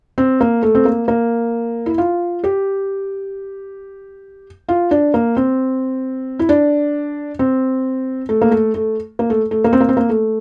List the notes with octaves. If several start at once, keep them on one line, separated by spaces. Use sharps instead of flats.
C4
A#3
A3
C4
A#3
A#3
E4
F4
G4
F4
D4
A#3
C4
E4
D4
C4
A3
A#3
A3
A3
A#3
A3
A3
A#3
C4
A#3
C4
A#3
A3